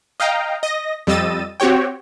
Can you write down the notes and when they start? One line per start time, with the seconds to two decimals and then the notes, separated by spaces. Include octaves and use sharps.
0.20 D#5 F5 G5 A#5
0.63 D#5 A#6
1.07 F2 G3 D#5 E6 A6 D#7
1.60 C4 F#4 G4 C#5 G5